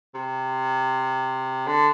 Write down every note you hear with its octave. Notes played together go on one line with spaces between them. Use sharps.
C3
D3